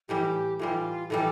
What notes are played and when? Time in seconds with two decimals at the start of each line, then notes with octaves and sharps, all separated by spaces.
0.09 A2 E3 G3 G4
0.59 A2 E3 G3 F4
1.10 A2 E3 G3 A4